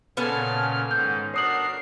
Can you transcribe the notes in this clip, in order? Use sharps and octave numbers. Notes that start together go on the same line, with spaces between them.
A#2 C#3 B3 C#4 A4 F6
G#2 D#3 G6
D4 F#4 A#4 C#5 D#6 C7 F#7